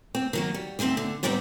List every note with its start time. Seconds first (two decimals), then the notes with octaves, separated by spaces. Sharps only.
0.15 C4
0.33 D#3 F#3 A#3
0.54 G3
0.79 D2 D#3 G#3 C4 E5
0.97 D3
1.23 G#2 C3 G3 B3 C4 D#4